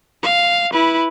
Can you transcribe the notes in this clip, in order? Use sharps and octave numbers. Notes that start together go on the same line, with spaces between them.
F5
E4 B4